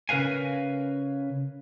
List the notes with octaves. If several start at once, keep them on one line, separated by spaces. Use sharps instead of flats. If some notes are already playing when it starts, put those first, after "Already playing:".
C#3 A#4 B4 F5 G#5